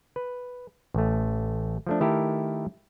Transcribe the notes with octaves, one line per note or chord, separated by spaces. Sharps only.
B4
A1 A3
F3 A3 D4
D#3 A3 E4 G4 A4 A#4